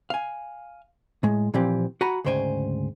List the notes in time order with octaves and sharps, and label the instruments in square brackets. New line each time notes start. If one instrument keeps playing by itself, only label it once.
[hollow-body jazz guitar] F5 G#5
A2 G#3
A#2 E3 F3 C4 G4
F#4 F#5 G#5 A#5 B5
D2 G#2 C#3 C5 G5 G#5